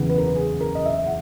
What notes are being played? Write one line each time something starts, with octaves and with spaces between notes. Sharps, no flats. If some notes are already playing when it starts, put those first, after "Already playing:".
Already playing: F#1 E2 C#3 E3 B3
B4
A#4
B4
G#4
A#4
D#5
E5
F#5